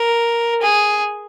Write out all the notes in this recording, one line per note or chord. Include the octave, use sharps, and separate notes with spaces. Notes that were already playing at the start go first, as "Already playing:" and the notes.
Already playing: A#4
G#4